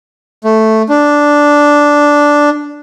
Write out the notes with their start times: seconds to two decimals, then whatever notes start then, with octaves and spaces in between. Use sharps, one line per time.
0.44 A3
0.89 D4